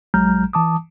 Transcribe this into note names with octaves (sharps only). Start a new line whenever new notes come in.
A#1 F#3 G#3 A#5 F6 G6
E3 A5 D6 D#6